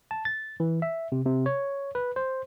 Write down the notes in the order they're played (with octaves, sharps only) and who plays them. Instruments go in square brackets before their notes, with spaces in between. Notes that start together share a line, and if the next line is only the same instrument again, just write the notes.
[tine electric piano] A5
A6
E3
E5
C3
C3
C#5
B4
C5